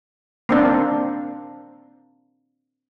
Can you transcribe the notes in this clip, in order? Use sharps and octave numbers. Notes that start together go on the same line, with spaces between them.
A#3 C4 D4